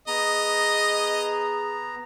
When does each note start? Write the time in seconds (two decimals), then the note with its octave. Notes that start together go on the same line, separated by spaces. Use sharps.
0.08 B3 G#4 D#5 A#5